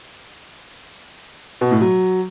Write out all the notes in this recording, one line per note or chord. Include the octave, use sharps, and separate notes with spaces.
B2
A2
F#3